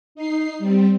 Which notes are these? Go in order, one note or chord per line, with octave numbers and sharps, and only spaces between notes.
D#4 C7
G3 C4